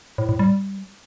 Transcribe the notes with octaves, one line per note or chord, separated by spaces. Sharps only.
A2
A2
G3